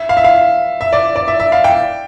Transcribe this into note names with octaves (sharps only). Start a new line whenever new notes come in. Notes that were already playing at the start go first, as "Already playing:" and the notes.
Already playing: E5
F5
E5
F5
E5
D5
D5
E5
E5
F5
G5